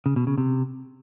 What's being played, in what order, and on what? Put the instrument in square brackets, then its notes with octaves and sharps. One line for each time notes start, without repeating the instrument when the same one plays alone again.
[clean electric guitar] C#3
B2
C#3
C3